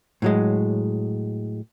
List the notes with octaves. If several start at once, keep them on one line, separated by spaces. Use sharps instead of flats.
A2 F#3 G#3